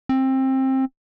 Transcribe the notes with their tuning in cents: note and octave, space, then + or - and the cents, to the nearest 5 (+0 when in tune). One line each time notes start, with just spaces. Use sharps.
C4 +20